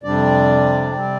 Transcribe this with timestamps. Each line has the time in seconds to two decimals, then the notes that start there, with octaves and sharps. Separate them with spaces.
0.03 F2 C3 G3 D4 D5
0.93 C3 G3 C4